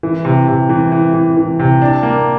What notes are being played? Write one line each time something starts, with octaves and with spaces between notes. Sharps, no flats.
E3
C3
C3
E3
E3
E3
E3
C3
D4
A#3